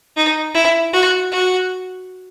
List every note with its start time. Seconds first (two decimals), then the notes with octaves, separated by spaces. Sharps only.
0.17 D#4
0.55 E4
0.93 F#4
1.32 F#4